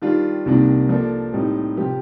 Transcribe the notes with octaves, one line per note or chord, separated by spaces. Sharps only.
D#3 G3 D4 F4
C2 C3 D#3 A#3 D4
F3 A#3 D4 A4 D5
A2 G3 C4 D#4
C3 F3 C4 G4